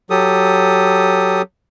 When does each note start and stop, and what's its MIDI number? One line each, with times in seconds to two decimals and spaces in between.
0.10 1.42 54
0.10 1.42 67
0.10 1.42 69
0.10 1.42 87